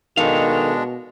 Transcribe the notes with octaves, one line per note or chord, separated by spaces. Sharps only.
B2 D#3 G#3 D4 A4 F5